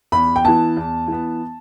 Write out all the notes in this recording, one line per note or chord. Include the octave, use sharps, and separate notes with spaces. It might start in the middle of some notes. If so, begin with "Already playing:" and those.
E2 B5
G5
E3 B3 A5
E2
E3 B3